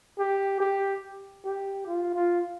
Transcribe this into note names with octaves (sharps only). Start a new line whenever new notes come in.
G4
G4
G4
F4
F4